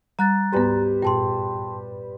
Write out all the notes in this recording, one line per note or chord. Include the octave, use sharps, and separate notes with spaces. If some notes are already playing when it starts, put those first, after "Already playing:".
G3 A#5 F#6 A6
D2 G#2 G3 B3 B4 C5
G2 A#2 G5 A5 C6